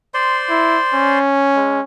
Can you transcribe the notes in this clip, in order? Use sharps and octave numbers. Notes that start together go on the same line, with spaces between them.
C5 D5 C6
E4
C#4
G#3